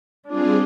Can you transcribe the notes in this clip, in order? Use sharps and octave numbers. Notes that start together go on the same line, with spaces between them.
G3 C4 D4 F4 G#4